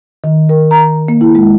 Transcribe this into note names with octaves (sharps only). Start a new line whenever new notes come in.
D#3
A#4
A#5
A#3
E4
G#3